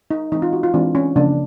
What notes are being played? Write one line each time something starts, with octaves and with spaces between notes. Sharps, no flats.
D#4
E3 G#3 C4 D#4
F4
F#4
F4
E3 G#3 C4 D4
C#4
C#3 F3 A#3 C#4 D4